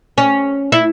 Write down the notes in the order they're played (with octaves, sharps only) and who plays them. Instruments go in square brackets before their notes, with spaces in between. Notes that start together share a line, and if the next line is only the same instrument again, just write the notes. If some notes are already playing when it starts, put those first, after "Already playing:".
[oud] C#4
E4